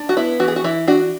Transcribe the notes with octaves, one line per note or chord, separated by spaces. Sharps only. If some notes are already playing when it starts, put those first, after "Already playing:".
Already playing: D4
F#4
B3 E4
E3 F#4
G#4
F#4
E3 E4
D4 F#4